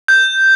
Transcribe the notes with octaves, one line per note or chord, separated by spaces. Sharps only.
G6